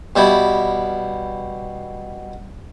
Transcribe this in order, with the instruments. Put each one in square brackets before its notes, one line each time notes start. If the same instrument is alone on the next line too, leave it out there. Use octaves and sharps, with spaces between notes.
[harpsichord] B2 G3 E4